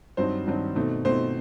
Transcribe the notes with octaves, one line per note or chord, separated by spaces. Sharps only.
G2 F#3 C4 D#4 C5
G2 F#3 C4 D#4
B2 A3 C4 D#4
B2 A3 C4 D#4 C5